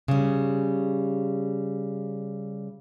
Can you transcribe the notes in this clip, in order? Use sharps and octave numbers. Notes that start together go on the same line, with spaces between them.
C#3 G3